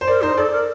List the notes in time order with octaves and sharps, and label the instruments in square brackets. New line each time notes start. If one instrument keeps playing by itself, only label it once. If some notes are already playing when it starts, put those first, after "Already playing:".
[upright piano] C5
[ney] A#4 [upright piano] D5
[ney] D#4 [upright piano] C5
[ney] A4 [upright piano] D5
[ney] A#4